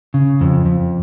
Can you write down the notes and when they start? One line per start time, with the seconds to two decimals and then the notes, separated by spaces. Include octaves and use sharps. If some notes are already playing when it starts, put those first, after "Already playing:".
0.14 C#3
0.41 F2
0.65 F2